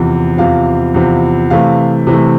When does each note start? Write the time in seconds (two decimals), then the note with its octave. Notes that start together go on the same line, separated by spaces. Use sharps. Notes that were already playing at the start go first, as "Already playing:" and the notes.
Already playing: E2 C3 F3
0.37 E2 C3 F3 F5
0.94 E2 C3 F3
1.50 C3 E3 A3 F5
2.07 C3 E3 A3